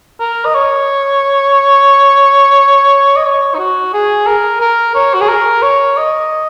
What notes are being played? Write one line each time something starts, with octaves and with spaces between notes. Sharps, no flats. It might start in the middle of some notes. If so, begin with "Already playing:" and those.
A#4
D#5
C#5
D#5
C#5
D#4
F#4
G#4
A#4
A#4
C#5
F#4
G#4
A#4
C#5
D#5